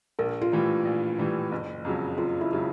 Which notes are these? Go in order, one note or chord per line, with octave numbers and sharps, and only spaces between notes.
A#1 A#4
F4
A2 E3 G3
A#1
A2 E3 G3
F#1
F2 C#3 F#3
F#1 F4
E4
C#3 F#3